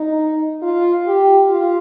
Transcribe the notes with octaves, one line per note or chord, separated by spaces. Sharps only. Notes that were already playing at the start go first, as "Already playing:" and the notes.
Already playing: D#4
F4
G4
F4